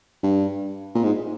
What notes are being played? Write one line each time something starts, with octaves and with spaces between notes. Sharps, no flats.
G2
A#2
G#2